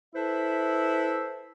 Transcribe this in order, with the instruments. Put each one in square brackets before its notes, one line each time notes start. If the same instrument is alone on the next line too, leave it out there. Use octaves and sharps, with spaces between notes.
[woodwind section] E4 A4 B4 C5 E5